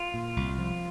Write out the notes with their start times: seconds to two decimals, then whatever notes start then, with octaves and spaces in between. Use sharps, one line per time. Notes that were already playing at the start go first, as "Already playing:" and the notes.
Already playing: F4
0.14 A#2
0.37 C2
0.58 F3